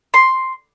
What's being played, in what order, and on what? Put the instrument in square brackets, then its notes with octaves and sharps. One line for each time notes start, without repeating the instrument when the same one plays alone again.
[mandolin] C6